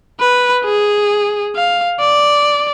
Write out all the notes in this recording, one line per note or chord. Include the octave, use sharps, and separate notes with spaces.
B4
G#4
F5
D5